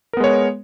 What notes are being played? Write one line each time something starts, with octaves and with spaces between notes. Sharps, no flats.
G#3 B3 A#4 C#5